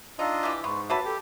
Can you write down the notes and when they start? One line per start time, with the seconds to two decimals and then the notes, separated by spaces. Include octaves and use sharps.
0.19 D4 D#4 F4 D#5 F5 A#5 E6
0.43 E3 G4
0.64 G#2 B3 C6 C#6
0.90 A#3 F#4 B4 C#5 E5 A5
1.05 G4 A4